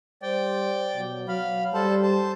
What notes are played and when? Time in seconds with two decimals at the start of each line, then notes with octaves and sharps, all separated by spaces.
0.22 G3 C5 D5 G5
0.95 B2 F#3
1.28 F#3 F5 B5
1.74 G3 A4 C5 A5
2.03 C5 A5